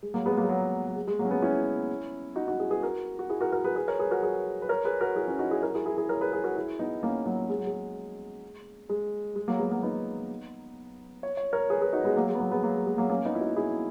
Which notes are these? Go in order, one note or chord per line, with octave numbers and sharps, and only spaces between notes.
G#3
F#3 A#3
G#3 B3
F#3 A#3
G#3
F#3
F#3
G#3
G#3
F#3 A#3
C#4
G#3 B3
C#4 E4
D#4 F#4
D#4 F#4
E4 G#4
G#4 B4
F#4 A#4
F#4
E4 G#4
F#4 A#4
F#4 A#4
G#4 B4
G#4 B4
A#4 C#5
G#4 B4
F#4 A#4
G#4 B4
B4
A#4 C#5
G#4 B4
F#4 A#4
E4 G#4
C#4 E4
D#4 F#4
E4 G#4
F#4 A#4
E4 G#4
E4 G#4
E4 G#4
A#4 C#5
G#4 B4
G#4 B4
F#4 A#4
E4 G#4
B3 D#4
A#3 C#4
F#3 A#3
G#3
F#3
G#3
G#3
G#3
F#3 A#3
G#3 B3
F#3 A#3
B3 D#4
C#5
C#5
A#4 C#5
G#4 B4
G#4 B4
D#4 F#4
G#3 B3
F#3 A#3
G#3
B3
F#3 A#3
G#3 B3
F#3 A#3
G#3
G#3
F#3 A#3
A#3 C#4
B3 D#4
E4
D#4 F#4
E4 G#4